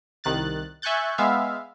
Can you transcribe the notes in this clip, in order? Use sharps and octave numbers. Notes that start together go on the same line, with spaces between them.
C2 D#3 F#6 A6
E5 G#5 C#6 F#6 G6 A6
G#3 B3 E5 F5